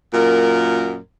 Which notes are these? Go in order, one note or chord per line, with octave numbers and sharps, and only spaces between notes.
F#2 A#2 A#4